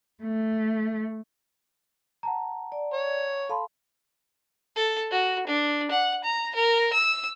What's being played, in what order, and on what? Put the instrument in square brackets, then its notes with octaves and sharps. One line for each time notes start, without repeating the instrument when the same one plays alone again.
[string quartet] A3
[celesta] F#5 A5 A#5
[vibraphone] D5
[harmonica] C#5
[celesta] A4 A5 C6 [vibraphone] F5 B5
[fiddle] A4
F#4
D4
F#5
A#5
A#4
E6